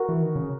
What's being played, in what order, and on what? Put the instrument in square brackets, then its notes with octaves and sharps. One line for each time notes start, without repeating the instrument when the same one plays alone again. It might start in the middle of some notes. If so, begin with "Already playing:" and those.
Already playing: [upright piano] F#4 A#4
[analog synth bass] E3
D#3
C#3